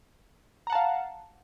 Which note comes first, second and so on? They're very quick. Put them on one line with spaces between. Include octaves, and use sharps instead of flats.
A#5 F#5 A5 F5